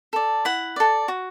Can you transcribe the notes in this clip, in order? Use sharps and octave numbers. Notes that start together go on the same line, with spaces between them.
A4 D5
E4 F#5
A4 D5
F#4